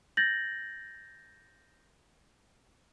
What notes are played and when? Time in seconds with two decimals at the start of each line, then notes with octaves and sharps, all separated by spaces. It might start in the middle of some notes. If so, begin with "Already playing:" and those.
0.17 G6 A6 A#6 F#7